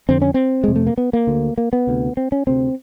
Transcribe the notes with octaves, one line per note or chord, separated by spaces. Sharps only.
F2 D3 C4
C#4
C4
F2 C3 G#3
A3
A#3
B3
A#3
D2 D3
A#3
B3
D2 C3
C4
C#4
D2 C3 C4